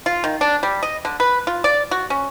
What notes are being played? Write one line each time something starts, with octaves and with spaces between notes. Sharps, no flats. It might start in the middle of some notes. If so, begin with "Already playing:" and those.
F4
D#3
D4
G3
D#5
D3
B4
F4
D5
F#4
C#4